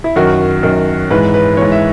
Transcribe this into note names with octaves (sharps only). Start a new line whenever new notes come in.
E4
F#2 D#3 F#4
F#2 D#3
G#2 E3 B4
B4
G#2 E3 C#5
E5